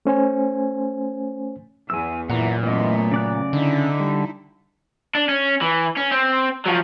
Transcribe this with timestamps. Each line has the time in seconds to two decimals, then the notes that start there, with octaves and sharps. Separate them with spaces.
0.05 A3 C#4 C5 G#5
1.90 E2 G#5 E6
2.30 F#2 A#2 E3 F#5 A#5
2.63 F#2 E3 A3 B3 D#5
3.12 C#3 D5 F#6
3.53 D3 D#4 E4
4.00 G3
5.15 D4
5.29 C#4
5.61 E3
5.97 C#4
6.11 C4
6.66 F3 F#3